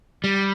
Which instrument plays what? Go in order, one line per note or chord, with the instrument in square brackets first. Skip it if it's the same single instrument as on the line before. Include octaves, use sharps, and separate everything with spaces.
[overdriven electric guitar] G3